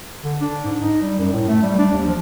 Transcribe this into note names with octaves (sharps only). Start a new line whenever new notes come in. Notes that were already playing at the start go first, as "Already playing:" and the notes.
D3
D4
G#2
D#4
G3
F#2
A2
A3
G3
D4
D#2
F3